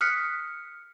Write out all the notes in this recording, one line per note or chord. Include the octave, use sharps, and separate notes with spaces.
D#6 F6 F#6 B6 C#7